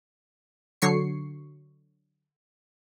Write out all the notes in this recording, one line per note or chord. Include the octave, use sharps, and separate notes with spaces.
D3 F#3 C#5 C#6 C7 C#7